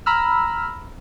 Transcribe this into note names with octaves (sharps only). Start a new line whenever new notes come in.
A#5 B5 E6 F6